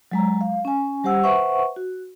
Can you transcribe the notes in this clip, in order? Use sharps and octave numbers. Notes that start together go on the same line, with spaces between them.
F#3 G#3 A#5
F5
C#4 G#5
G3 G4 C5 F#5 E6
B4 C5 E5 F#5 C#6
F#4